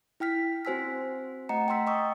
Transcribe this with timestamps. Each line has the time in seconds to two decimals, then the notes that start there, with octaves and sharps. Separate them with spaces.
0.20 E4 G5 F6 B6
0.65 C4 F#4 C5 G#5 E6 B6
1.49 A3 D#5 F#5 A#5 C#7
1.68 G5 A#5 C6 E6 B6
1.87 D#5 G5 C#6 D#6 E6